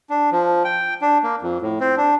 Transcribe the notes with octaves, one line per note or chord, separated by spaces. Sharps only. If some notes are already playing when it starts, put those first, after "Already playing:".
D4
F3
G5
D4
A#3
F2
A2
C4
D4